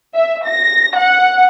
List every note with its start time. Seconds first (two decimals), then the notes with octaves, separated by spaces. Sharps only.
0.15 E5
0.48 A#6
0.97 F#5